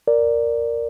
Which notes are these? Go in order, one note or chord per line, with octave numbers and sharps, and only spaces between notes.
A#4 D5